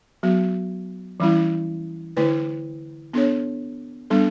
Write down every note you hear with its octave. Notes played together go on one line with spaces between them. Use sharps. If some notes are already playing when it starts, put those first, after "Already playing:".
F#3 B3 F#4
E3 G3 C#4 E4
D3 A3 E4 B4 D5
B3 D4 A4 C#5
G3 B3 D4 A4